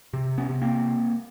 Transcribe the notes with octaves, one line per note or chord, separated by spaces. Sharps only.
C3
B3 C#4
C3
A#3 C4